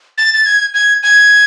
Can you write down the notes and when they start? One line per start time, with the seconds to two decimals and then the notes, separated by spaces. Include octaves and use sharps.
0.18 A6
0.34 A6
0.46 G#6
0.74 G#6
1.03 G#6